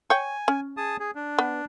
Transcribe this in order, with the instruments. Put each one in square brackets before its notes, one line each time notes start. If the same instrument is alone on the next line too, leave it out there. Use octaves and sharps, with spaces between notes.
[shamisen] C#5 G5 [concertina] G#5
[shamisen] C#4
[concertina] G#4 A5 D#6
G#4
D4
[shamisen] B3